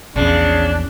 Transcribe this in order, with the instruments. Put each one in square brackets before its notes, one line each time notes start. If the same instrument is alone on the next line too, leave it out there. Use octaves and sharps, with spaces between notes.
[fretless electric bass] A#1 E2 [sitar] C#3 [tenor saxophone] D4